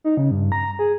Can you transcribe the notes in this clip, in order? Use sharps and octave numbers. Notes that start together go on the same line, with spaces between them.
D#4
C#3
G2
A#5
G#4